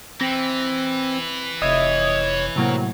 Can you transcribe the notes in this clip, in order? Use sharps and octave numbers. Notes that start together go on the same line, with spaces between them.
E3 C4 A#6
F1 C#5 D#5 E5 D#6
A2 C3 F#3 A#3